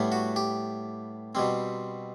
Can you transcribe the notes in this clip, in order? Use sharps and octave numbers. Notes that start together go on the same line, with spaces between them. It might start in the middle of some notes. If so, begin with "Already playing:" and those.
Already playing: A2 G3 B3
F#4
G4
B2 G3 C4